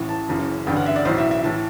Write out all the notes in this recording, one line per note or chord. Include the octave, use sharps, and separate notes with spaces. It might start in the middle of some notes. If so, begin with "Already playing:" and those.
Already playing: A1 A2 E3
A5
F#1 F#2 E3
A1 G2 D3 G5
F#5
E5
D5
B1 A2 E3 C5
E5
E5
A2 E3 A5